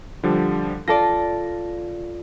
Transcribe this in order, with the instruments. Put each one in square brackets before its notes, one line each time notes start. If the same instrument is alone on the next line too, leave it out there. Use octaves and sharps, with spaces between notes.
[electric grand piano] D3 F3 G3
[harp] F4 A4 D5 [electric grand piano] A#6